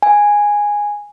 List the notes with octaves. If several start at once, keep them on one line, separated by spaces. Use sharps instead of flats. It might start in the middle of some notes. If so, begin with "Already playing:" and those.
G#5